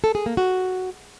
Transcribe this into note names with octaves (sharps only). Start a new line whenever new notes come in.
A4
G#4
A#3
F#4